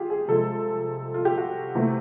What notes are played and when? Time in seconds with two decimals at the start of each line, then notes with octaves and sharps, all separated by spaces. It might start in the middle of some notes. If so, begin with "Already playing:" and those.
Already playing: F4 G4 G#4
0.10 G#4
0.28 C3 F3 G#3 A4
1.14 F4
1.25 G4
1.38 F#4
1.75 C3 E3 A3